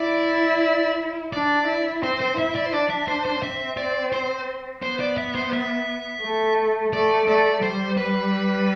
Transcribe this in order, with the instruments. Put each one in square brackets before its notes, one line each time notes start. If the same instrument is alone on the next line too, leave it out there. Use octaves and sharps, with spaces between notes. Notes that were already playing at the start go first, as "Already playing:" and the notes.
Already playing: [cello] E4 [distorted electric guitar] D5
[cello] D4 [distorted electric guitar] D5
[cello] E4
[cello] C4 [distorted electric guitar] C5
[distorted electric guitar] C5
[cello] E4 [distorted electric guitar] E5
[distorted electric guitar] D5
C5
[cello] D4 [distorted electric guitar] D5
[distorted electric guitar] E5
C5
C5
[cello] C4 [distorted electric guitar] E5
[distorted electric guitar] D5
C5
[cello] B3 [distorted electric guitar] C5
[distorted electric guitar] D5
E5
C5
E5
[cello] A3
[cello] A3 [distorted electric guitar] D5
[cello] A3 [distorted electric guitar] D5
[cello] G3 [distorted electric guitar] C5
[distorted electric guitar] B4